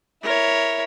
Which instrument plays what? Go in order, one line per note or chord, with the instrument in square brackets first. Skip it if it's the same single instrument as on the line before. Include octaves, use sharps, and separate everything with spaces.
[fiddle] E4 C#5 [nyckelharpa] A#4